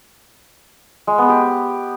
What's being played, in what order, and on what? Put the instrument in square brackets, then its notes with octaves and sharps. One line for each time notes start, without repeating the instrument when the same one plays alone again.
[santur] G#3
B3
G4